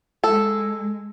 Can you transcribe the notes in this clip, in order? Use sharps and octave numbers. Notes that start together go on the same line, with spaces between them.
G#3 A4